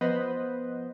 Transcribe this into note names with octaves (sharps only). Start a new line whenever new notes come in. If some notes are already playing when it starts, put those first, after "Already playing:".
F3 B3 B4 C5 D#5